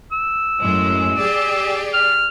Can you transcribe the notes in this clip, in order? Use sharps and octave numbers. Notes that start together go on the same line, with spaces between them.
E6
F#2 A2 G#3
G4 G#4 D5
F6